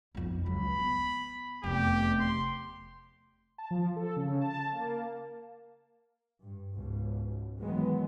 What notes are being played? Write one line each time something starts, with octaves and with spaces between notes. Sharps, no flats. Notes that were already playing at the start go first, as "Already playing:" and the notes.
B1 F2
C#2 F#3 B5
B3
F1 E2 G4
C6
A5
F3
A4
C#3
A5
A#3
G2
C#2 G#2 B2
B2 D#3 E3 F#3 G#3 B3